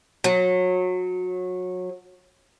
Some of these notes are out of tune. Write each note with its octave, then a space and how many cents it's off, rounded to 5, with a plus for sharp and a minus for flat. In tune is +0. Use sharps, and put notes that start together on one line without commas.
F#3 -25